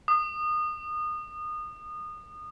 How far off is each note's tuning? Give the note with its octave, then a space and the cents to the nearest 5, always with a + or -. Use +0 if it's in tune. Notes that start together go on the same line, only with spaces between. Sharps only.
D#6 -25